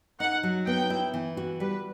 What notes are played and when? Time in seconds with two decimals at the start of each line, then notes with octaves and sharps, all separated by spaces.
0.20 D#4 F#5
0.43 F#3
0.67 B3 G5
0.90 E4
1.14 E3
1.37 F#4
1.60 G3 B4